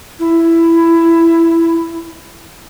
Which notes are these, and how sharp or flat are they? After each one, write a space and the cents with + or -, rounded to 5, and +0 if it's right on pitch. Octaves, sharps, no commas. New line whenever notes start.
E4 +10